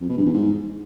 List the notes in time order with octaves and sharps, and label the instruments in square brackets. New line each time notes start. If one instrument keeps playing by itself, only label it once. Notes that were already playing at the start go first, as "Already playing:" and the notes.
[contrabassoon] F2
B2
G2
E2
G#2